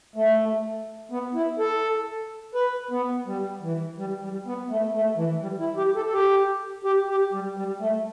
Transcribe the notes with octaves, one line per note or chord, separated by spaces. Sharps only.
A3
B3
E4
A4
B4
B3
G3
E3
G3
G3
B3
A3
A3
E3
G3
E4
G4
A4
A4
G4
G4
G4
G3
G3
A3